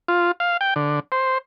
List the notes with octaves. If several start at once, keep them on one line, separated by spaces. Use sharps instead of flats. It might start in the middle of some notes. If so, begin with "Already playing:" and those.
F4
F5
G5
D3
C5